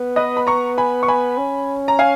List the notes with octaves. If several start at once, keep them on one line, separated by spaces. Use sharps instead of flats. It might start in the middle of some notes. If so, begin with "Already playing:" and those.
Already playing: B3
B4 D#5
B5
A#5 C#6
G#5 B5
C#6
G#5 B5
C#4
A#5
F5 G#5